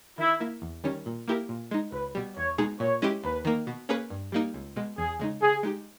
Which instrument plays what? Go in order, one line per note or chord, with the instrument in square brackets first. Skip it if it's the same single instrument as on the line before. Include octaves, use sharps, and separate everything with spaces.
[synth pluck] D#3 [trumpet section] E4
[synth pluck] A#3 E4
E2
D#3 G3 C#4
A#2
A#3 E4 G4 A#4
A#2
G#3 D#4
[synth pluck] C#2 [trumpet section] B4
[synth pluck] B2 G3
[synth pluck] E2 [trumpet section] C#5
[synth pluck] B2 G#3 D#4 G#4
[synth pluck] A#2 [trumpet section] C#5
[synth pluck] G#3 C#4 E4 G4
[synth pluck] D#2 [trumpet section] B4
[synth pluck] D#3 A#3
B2
A#3 C#4 G#4 B4
G2
G3 A#3 D#4
C#2
B2 G#3
[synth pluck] E2 [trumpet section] G#4
[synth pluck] C#3 G#3 D#4
[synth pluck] C#3 [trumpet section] G#4
[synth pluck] G#3 D#4 G4